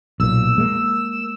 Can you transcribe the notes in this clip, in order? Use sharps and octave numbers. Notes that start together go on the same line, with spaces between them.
B1 A#2 E6
G#3 A#3